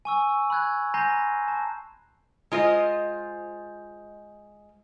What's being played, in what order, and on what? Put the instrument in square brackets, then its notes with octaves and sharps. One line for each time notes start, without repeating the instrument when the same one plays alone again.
[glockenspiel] G#5 C#6 E6
B5 E6 F#6 G#6
G#5 A#5 C6 G6 A#6 C7
A5
[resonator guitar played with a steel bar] G#3 F4 C5 D#5